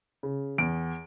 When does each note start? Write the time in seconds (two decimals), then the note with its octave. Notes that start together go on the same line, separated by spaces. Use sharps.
0.23 C#3
0.58 E2 D7